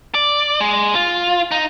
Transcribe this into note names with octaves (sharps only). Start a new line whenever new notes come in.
D5
G#3
F4
D#4